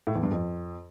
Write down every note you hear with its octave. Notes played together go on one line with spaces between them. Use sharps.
A2
E2
G2
F2